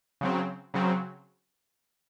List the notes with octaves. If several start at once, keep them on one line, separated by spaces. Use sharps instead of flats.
C#3 F#3 C4
C#3 F#3 C4